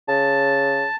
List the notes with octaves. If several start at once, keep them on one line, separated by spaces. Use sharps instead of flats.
C#3 A5